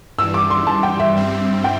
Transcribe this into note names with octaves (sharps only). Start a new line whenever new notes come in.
G2 E3 G3 E6
D6
C6
A5
G5
E5
G2 G3 C4
G5